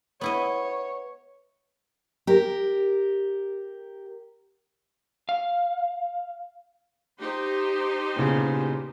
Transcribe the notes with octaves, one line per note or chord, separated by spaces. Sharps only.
B3 E4 C#5 D#5
G4 A#4
F5
D#4 G4 C5
E2 A#2 C#3